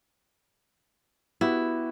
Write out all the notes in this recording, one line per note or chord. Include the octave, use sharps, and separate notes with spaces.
B3 E4 F#4 G4